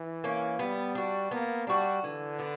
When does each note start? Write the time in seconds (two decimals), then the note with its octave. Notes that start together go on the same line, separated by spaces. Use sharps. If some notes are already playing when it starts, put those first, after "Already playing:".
Already playing: E3
0.24 A#3 C#4
0.59 G3 B3
0.95 D4 F#4
1.31 A#3 B3
1.67 G3 D4 F#4
2.03 D3 E3
2.39 B3 D4